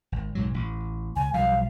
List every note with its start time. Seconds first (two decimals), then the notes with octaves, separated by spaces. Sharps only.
0.12 G#1
0.35 B1 G#2 F#3
0.54 A1
1.16 C#2 G#5
1.34 B1 F3 G3 F5